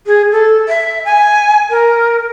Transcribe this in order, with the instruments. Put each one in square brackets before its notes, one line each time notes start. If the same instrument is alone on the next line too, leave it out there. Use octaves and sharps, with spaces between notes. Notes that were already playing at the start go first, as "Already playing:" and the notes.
[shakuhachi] G#4
A4
E5
G#5
A#4